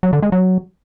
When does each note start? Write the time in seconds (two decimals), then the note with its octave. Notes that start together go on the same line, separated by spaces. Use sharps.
0.03 F#3
0.13 D3
0.23 G#3
0.32 F#3